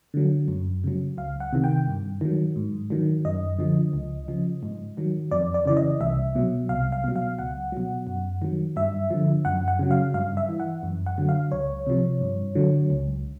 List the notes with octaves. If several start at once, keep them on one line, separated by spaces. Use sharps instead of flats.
D3 F#3
F#2
C#3 F#3
C#2 F5
F#5
C3 D#3
G5
G2
D#3 F#3
G#2
D#3 F#3
F#2 D#5
D3 F3
C#2
C#3 F3
G#2
D#3 F#3
F2 D5
D5
C#3 E3 D5
D#5
C2 E5
B2 F#3
C2 F5
F5
B2 F#3
F5
C#2 F#5
B2 F#3
F#2
D#3 F#3
G2 E5
D3 F3
F#2 F#5
F#5
C#3 F#3
F5
G2 F5
E5
E3
F#5
F#2
F#5
D3 F#3
F5
C#2 C#5
C3 F3
G2
D3 F#3
C#2